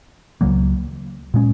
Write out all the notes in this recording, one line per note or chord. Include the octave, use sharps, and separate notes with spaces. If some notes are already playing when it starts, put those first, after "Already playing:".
C#2 C#3 F#3 A#3
A#2 G#3 C#4